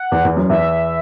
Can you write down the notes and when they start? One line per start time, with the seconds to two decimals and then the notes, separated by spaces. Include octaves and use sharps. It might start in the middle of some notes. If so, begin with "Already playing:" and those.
Already playing: F#5
0.12 E2
0.25 E2
0.37 F#2
0.50 E2 E5